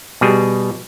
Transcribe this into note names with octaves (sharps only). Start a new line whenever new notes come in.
B2 G3 G#4